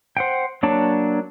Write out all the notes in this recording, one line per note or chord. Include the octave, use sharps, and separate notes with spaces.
C5 F#5 G5
F#3 A#3 D4 C#5 A5